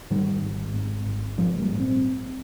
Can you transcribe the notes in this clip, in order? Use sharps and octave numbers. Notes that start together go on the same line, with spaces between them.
G#2 D#3 G3
G#1
G#2
G#1
G#2 F3 G#3
G3 A#3
A#1
C4